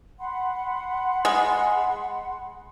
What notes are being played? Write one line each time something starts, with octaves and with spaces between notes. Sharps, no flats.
F#5 B5 C6
G#3